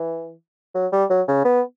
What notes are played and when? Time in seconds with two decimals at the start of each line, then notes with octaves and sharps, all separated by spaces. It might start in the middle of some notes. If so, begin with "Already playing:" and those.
Already playing: E3
0.74 F#3
0.92 G3
1.10 F#3
1.28 C#3
1.45 B3